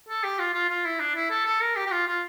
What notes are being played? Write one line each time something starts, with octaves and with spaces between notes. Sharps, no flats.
A4
G4
F4
F4
F4
E4
D4
E4
A4
A4
A#4
G4
G4
F4
F4